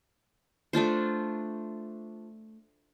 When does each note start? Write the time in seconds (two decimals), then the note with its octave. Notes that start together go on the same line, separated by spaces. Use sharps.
0.73 A3 D4 F4 C5